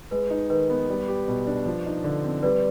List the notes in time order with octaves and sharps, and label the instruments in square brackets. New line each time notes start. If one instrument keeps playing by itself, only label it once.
[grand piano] G#3 [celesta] B4
[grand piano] D#4
[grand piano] D#3 [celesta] B4
[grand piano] B3
G3
G4
B2
D4
F3
D#4
D3
C4
[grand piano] G3 [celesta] B4 D5